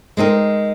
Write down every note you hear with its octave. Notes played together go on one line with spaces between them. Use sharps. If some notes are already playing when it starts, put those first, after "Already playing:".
G#3 C4 D#4 A#4